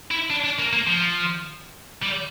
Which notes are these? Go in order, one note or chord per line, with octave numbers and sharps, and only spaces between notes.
E4
D4
D4
A#3
A#3
F3
G3